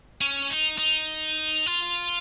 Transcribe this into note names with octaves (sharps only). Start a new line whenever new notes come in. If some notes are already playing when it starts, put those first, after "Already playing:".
C#4
D#4
D#4
F4